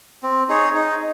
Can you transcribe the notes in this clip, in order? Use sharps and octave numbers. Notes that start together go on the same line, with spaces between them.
C4
D#4 G#4 C#5
D#4